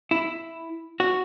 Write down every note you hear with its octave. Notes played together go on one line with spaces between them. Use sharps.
E4
F#4